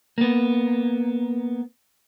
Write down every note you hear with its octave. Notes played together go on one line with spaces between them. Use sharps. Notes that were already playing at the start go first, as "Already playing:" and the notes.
A#3 B3